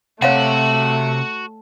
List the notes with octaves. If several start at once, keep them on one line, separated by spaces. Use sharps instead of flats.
C3 A3 F#4 C#5 F5 F#5